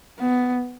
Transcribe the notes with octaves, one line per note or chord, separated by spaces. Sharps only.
B3